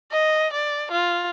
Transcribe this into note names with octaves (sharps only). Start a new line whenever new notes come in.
D#5
D5
F4